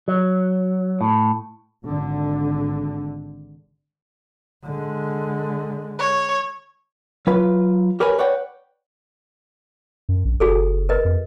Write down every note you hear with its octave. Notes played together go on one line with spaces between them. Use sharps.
F#3
A2
G#1 D3
D3 G#3
C#5
F#3 F4 B4
G4 A#4 B4 C#5 G#5 B5
B4 C#5 D5 F#5 G5
F#2
A#1
F#1 F#4 G#4 A4
A#4 B4 D#5
F2